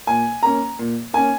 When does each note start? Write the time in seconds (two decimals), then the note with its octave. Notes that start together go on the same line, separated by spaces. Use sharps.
0.07 A#2 G#5
0.43 A#3 C#4 A#5
0.79 A#2
1.14 A#3 C#4 G#5